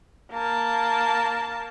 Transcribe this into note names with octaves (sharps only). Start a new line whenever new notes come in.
A#3 A5